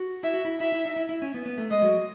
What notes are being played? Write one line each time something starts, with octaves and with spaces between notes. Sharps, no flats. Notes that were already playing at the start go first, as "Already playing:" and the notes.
Already playing: F#4
E4 E5
F#4
E4
E4 E5
E4
D#4
E4
E4
C#4
B3
B3
A3
G#3 D#5
F#3